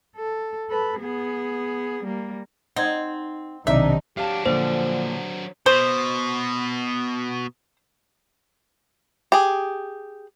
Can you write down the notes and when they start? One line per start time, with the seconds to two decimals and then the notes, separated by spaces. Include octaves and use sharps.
0.15 A4
0.70 A4 B4
1.00 B3 G#4
2.04 G3 A#3
2.76 C4 D#4 F#5 G#6
3.67 B1 C3 D#3 D4 D#4 E5
4.17 F#3 D4 G4 F5 A5
4.45 A#2 D3 F3 C5
5.66 B2 C5
9.32 G4 G#4